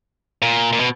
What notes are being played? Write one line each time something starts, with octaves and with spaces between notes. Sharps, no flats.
A#2
A#2
B2